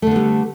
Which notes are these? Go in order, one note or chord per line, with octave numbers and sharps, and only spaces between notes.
D3 G3 A3 B3